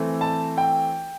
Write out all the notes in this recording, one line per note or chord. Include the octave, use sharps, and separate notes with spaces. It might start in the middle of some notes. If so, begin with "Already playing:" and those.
Already playing: E3 A3 C4
A5
G5